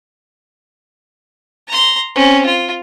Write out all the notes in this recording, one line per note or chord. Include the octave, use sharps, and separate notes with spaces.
A#5 C6
C4 C#4
F4